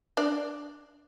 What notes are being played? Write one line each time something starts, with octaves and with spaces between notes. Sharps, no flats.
D4 D5